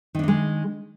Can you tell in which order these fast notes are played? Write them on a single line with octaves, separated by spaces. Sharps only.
D#3 D4 D#4 G#3